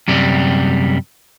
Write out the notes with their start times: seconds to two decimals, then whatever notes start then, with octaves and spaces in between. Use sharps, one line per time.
0.08 F#2 C3 G3